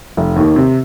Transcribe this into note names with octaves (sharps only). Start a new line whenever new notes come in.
F1
D#2 D#3
C3